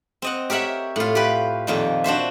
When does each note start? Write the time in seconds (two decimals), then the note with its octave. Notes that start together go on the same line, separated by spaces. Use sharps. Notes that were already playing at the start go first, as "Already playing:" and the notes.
0.22 C4 D#5 F#5
0.50 G4 A#4 C#5 E5 F#5
0.96 A2 F4
1.15 G4 B4
1.67 F2 A#2 D#3
2.04 D4 F#4 C5 E5